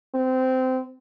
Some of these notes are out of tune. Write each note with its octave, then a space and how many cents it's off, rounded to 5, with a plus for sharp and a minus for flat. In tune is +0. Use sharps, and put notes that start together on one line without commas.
C4 -20